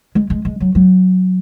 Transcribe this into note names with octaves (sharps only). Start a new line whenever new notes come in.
G#3
G#3
G#3
F#3
F#3